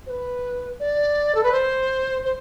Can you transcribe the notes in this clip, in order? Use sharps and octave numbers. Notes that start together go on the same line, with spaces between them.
C5
B4
D5
A4
B4
C5
C5